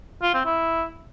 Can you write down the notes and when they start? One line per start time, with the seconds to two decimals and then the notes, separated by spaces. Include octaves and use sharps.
0.22 F4
0.34 C4
0.45 E4